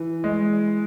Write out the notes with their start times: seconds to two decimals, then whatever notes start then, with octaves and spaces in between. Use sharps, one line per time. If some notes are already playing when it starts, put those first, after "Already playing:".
Already playing: E3
0.24 G#3